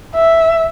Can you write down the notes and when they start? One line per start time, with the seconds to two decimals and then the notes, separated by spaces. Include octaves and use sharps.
0.15 E5